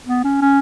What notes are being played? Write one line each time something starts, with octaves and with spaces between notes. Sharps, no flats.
B3
C#4
C#4